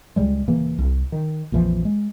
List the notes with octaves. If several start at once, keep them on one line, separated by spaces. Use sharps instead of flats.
C#2 C#3 G3 G#3
D#1 C#3 E3 A#3
C2
D#3
A#1 F2 E3 F3
G#3